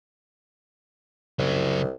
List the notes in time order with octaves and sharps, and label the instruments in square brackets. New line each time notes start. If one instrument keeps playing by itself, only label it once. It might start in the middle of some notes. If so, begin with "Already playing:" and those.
[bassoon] C2 [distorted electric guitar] C#3 F#3